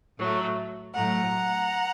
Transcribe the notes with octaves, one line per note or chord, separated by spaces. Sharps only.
A2 F#3 A3
A2 F#3 A3 F#5 A#5